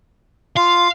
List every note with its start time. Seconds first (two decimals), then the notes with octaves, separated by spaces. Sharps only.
0.57 F4 F5